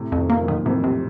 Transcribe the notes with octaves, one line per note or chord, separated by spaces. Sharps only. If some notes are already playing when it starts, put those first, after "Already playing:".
Already playing: A2 C3
F2
C3 D#3
A#3
F#2 A#2
D#3
F2 A2 C3
C3